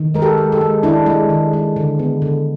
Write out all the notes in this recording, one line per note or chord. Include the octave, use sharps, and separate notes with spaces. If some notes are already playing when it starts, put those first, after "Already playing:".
Already playing: D#3
G#3 A#4
G4 A4
G#3
G4 A4
G#3
D#3 D4 E4
G#3
D#3
G#3
D3
B3
D3